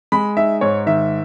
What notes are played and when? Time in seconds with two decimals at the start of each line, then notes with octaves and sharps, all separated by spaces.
0.12 G#3 B5
0.37 D#4 E5
0.61 G#2 C#5
0.86 D#3 E5